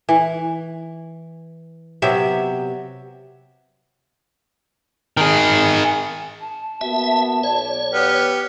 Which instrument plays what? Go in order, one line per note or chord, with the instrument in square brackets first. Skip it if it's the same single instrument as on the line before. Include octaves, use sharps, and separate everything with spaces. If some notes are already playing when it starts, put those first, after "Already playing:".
[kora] E3
C3 F#3 B3 E5
[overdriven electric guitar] D#3 G#4
[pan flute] A5
[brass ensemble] A#3 B3 F#4 [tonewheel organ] E5
[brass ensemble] B1 D5 [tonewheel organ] C#5
[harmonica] B3 G4 [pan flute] F6